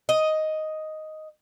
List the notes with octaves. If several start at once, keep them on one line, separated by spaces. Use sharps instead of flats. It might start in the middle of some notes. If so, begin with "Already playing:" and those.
D#5